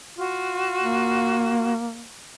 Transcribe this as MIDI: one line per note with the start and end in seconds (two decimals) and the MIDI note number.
0.17 1.72 65
0.17 1.72 66
0.82 2.07 58